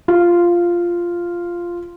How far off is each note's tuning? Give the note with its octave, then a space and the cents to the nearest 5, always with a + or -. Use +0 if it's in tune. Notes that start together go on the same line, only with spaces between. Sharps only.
F4 -5